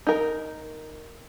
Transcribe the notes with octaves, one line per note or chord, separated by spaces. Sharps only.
D#4 A#4